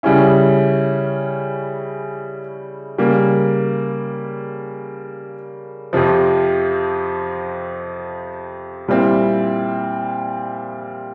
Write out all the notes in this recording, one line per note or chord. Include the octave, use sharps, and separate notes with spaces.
C#3 G3 C#4 E4
C#3 G3 A#3
F2 C3 F3
A#2 G3 C4 E4